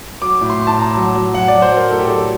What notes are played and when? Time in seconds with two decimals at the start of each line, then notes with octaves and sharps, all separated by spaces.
0.21 F#3 D6
0.41 A2
0.50 C6
0.59 A2
0.67 A5
0.78 A2 A#5
0.97 F#3
1.16 F#3
1.34 F#3 F#5
1.48 F#3 D5
1.62 C5
1.73 F#3 A#4
1.91 A2 A4
1.99 G4
2.07 F#3 A4